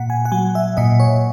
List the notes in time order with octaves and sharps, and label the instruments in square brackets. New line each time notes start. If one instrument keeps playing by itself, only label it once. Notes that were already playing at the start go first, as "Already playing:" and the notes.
Already playing: [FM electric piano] A#2 F#5
G#5
F#5
F#3 G#5
E5
A#2 D#5
C#5